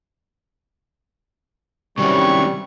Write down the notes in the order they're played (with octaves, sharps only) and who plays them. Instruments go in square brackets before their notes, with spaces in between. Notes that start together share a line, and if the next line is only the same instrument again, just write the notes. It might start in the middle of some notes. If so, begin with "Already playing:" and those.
[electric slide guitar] C3 D#3 F#3 [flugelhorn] G3 [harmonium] C4 C#4 E4 [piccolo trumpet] C#6